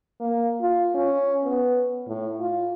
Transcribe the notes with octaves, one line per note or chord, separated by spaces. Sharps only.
A#3
F4
C#4
B3
A2
F4